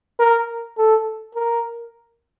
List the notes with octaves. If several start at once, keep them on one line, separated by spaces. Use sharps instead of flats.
A#4
A4
A#4